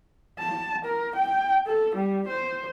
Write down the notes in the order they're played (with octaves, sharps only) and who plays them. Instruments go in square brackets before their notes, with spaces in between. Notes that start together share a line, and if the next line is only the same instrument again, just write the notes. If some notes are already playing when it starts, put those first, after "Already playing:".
[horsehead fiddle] A5
A#4
G5
A4
G3
C5